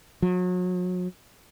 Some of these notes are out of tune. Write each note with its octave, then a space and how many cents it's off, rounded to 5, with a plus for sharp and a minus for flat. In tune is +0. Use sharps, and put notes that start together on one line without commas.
F#3 -35